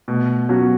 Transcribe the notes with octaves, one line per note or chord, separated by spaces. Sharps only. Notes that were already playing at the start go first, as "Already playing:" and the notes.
B2 A3
F#3 B3 C#4 F#4